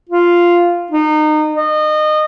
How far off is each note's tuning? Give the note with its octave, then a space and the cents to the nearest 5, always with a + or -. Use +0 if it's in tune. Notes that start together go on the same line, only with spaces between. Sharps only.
F4 -5
D#4 -30
D#5 -25